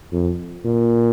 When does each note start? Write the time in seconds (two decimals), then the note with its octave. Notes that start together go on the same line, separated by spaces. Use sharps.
0.12 F2
0.64 A#2